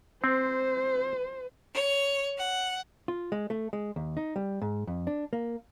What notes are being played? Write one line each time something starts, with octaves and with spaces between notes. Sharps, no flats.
C4 C5
C#5
F#5
F4
G#3
A3
G#3
D#2
D#4
G3
G#2
F2
D4
A#3